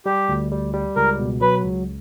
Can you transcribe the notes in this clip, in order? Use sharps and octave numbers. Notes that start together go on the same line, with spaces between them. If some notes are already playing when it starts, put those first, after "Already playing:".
G3 G4
D2
G3
G3
C#2 A#4
B2
F#3 B4
C#2